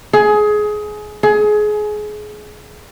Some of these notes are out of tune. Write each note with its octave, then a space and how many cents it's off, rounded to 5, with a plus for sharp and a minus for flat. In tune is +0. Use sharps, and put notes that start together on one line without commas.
G#4 +20
G#4 +25